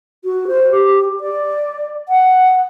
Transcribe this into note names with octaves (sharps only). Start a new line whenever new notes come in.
F#4
C5
G4
D5
F#5